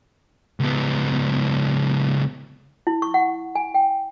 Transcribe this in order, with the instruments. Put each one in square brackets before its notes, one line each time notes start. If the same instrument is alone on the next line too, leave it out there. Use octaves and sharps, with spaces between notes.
[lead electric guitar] C#2 B3
[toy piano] E4
C#6
F#5
G#5
G5